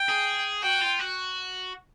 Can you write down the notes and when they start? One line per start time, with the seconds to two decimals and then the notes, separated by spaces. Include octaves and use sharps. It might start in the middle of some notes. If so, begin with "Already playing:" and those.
Already playing: G5
0.08 G#4
0.63 F#4 G5
0.81 F4
0.99 F#4